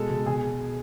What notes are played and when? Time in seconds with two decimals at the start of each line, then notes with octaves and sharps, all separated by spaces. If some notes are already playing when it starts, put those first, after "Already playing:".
Already playing: B2 G#3 A4
0.10 B2
0.26 B2 G#4